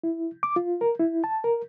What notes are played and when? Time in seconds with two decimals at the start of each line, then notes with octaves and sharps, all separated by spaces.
0.04 E4
0.43 D6
0.56 F4
0.81 A#4
1.00 E4
1.24 A5
1.44 A#4